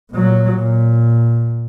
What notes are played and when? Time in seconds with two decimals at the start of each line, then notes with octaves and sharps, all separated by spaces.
0.12 A#2 F#3
0.55 A#2